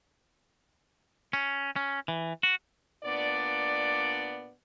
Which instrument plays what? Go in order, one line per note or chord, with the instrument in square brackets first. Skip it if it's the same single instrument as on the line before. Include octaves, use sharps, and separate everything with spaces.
[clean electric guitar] C#4
C#4
E3
F#4
[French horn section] A#2 B3 D4 D5